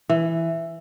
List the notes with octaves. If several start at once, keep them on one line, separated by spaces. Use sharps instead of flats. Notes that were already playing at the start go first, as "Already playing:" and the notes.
E3